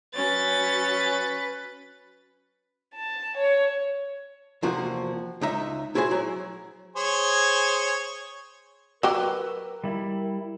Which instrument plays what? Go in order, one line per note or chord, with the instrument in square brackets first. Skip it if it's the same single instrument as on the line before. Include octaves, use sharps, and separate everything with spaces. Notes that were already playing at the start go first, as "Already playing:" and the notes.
[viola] F#3 [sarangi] C#4 [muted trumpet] B4 [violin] A6
[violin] A5
C#5
[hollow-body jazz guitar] E2 C3 F3 A#3 F#4
C#2 D#4 E5
E4 F#4 G#4 C5 G#5
F#3
[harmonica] G#4 C5 C#5
[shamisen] F#3 G4 [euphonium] A#4 [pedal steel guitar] B4 E6 F#6
[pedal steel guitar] G3 E4